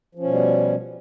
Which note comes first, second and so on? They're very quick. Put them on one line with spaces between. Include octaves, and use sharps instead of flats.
F3 C#4 B2 G3